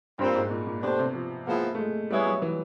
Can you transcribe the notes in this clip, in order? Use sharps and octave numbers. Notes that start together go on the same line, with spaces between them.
G2 A#2 G3 C4
G#2
A#2
A#2
B2 A3 D4 G4 C5
C3
F3
F3 G#3 A#3 B3 E4
A3
G#3
G3 G#3 B3 E4 G#4 C#5
F#3
E3